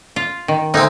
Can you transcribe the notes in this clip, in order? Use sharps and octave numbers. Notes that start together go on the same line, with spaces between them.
F4
D#3
D2 G#3 C4 D#4